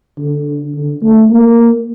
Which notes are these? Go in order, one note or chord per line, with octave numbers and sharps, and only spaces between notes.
D3
D3
A3
A#3